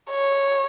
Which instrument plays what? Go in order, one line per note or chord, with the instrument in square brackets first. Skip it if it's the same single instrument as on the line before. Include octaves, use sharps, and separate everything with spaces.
[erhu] C#5